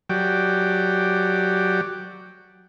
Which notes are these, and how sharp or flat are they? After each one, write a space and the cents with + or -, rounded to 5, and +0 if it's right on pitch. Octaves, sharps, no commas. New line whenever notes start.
F#3 +0 G4 +0 D5 +0